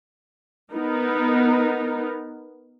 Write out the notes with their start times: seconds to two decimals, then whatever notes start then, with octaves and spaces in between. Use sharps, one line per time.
0.72 B3 D#4 A#4